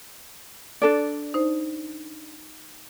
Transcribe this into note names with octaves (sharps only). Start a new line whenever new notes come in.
D4 A4 D5
D#4 C5